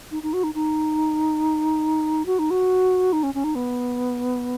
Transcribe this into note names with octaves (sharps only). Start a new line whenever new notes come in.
D#4
D#4
F#4
D#4
D#4
F#4
D#4
F#4
D#4
C#4
C#4
D#4
B3